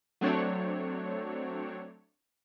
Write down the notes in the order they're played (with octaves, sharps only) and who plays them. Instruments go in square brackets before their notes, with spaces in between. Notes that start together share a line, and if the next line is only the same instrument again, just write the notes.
[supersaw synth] F#3 A3 C4 D4 C#5